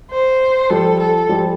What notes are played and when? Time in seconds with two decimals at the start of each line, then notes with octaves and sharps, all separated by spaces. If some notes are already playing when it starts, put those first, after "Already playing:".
0.11 C5
0.70 F3 G3 A4
1.00 A4
1.29 F3 G3